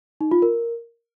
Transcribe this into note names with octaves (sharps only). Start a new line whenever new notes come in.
D#4
F4
A#4